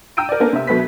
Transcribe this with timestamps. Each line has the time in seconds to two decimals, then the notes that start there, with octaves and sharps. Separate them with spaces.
0.17 G5 A#5 E6 G6 D7 D#7
0.29 A#4 D5
0.40 A#3 B3 C#4 D4 A4 A#4
0.53 C3 B4 E5
0.67 B2 F#3 A3 B3 B4 B6